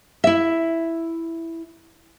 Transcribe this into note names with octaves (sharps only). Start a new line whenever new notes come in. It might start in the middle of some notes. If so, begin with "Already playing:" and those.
E4 E5